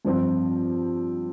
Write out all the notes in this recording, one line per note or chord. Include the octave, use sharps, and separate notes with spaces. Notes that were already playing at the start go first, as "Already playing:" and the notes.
G2 F3 C4